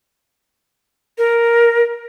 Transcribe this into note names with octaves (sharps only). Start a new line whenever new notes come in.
A#4